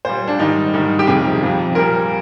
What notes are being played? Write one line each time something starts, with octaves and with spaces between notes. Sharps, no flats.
A#2 G3 C5
D4
G#2 D#3 G3 D#4
G#2 D#3 G3
G4
F2 C3 D#3 G3 G#4
F2 C3 F3
A#2 G3 A#4